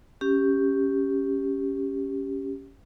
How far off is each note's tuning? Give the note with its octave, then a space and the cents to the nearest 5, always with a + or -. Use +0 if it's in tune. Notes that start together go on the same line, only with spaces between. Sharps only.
C#4 +0 G4 +0